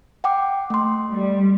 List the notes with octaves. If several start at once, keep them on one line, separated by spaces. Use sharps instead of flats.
F#5 G5 D6
A3 C6
G3